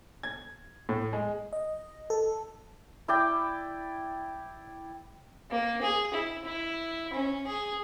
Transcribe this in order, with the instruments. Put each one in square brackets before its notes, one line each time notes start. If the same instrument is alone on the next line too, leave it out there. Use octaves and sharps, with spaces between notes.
[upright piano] G#6
A2
G#3
[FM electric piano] D#5
A4
[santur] E4 D5 G5
[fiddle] A#3
G#4
E4
E4
C#4
G#4